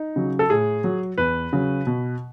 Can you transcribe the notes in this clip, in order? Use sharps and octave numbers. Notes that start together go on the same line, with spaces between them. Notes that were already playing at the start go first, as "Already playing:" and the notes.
Already playing: D#4
C#3 F#3
A4
A2 G#4
F#3
E2 B4
C#3 F#3
B2